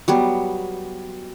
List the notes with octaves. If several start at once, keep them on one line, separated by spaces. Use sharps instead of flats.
F#3 G3 B3